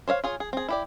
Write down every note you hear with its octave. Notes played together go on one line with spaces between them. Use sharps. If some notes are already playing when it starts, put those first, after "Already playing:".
C5 C#5 D#5 F5
F4 G#4 C#5
G#4
C4 G#4
E4 G4 D5